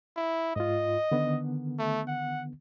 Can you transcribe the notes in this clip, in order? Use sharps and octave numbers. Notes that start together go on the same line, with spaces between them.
E4
G#2 F4 D#5
D3 D#3 B3
A3
F#5